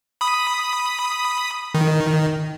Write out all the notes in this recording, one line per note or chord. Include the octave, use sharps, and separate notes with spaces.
B5 D#6
D#3